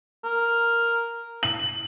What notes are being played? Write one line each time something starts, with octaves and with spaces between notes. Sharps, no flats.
A#4
F#7